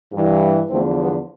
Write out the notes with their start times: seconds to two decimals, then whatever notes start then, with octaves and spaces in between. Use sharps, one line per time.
0.12 G2 E3
0.70 E2 D3 F3 A3 C4
0.99 G3 B3